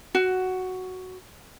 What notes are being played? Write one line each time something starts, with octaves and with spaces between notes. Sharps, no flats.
F#4